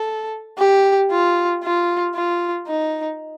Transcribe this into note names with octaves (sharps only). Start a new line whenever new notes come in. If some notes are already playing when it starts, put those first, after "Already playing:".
Already playing: A4
G4
F4
F4
F4
D#4